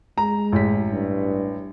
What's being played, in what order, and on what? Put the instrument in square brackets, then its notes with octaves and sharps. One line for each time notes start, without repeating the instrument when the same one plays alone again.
[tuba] G#3 [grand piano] A#5
[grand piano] A1 B6
[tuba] G2